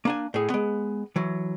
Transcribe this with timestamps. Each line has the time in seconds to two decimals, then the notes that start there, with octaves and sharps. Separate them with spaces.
0.05 A#3 D4 G#5
0.34 A2 G#4
0.50 G#3 B3
1.16 E3 F#3